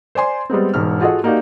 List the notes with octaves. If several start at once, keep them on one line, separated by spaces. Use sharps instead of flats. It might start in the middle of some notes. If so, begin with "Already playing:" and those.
C5 D5 G#5 C6
G3 G#3 B3 C4
E1 G#2 F6
F4 F#4 G#4 A4 D#5 F#5
A#3 D#4 F#4 G4 D5 F5